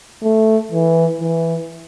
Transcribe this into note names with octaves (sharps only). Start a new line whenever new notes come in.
A3
E3
E3